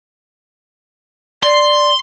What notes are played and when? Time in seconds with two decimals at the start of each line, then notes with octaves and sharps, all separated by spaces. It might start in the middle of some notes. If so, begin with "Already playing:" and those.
1.43 D5 C6